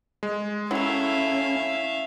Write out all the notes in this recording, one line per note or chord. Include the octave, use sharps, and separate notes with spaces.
G#3
F#3 A3 C#4 E4 E5 F5